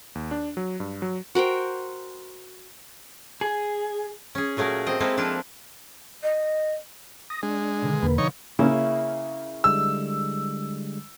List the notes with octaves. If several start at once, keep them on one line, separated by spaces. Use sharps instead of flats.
D#2
D4
F#3
G2
F#3
F#4 A#4 C5 G5
G#4
C#4 G#4
A#2 F#3 A3 G#4 A#4
C4 D#5
G#3 A#3 C4 E4 F4 A4
F3 D4 E4 F4
D#5
D#6 A#6
G#3 D4
B2 D3 D#3
E2 D3 A#3 B4
D3 F3 B3 D#4 C#5
C#3 A#3 C#4 E4
D3 G3 G#3 E6